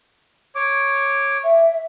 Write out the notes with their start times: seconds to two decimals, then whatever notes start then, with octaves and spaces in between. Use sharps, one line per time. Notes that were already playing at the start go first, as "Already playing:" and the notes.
0.55 C#5 D6
1.44 E5